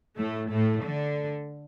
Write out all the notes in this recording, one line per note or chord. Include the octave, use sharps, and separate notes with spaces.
A2 A3
A2 A3
D3